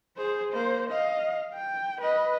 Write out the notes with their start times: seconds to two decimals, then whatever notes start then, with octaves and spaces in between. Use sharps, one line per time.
0.17 G#4 C5
0.53 A#3 C5
0.90 D#5 F5
1.54 G5
2.01 B4 D#5